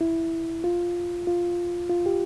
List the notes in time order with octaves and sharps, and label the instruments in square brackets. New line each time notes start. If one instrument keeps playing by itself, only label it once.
[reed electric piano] E4
F4
F4
F4
G4